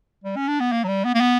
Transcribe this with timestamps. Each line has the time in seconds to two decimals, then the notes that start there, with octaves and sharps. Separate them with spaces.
0.24 G3
0.36 C#4
0.48 D4
0.60 B3
0.72 A#3
0.84 F#3
0.88 G3
1.05 B3
1.15 A#3
1.20 B3